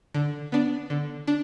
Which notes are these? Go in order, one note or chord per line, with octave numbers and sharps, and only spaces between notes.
D3
B3 D4
D3
D4